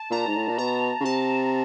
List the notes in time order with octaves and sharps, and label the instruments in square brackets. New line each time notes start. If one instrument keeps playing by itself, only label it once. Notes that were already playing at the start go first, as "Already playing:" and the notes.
Already playing: [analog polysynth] A5
[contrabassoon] A#2 [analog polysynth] A#5
[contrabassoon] G#2
A2
A#2
[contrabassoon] B2 [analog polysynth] A#5
[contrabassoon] C#3
[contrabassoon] C3 [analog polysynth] A5